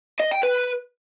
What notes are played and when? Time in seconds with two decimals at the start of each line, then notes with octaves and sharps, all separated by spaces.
0.20 D#5
0.31 G5
0.43 B4